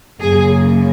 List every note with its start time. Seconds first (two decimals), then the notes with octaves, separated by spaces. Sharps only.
0.20 F#2 C#3 A#3 G#4